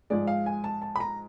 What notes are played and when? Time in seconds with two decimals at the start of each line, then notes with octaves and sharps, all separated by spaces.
0.10 G#2 F3 G#3 D5
0.27 F5
0.46 G#5
0.64 A5
0.82 A5
0.96 B5
1.00 A#5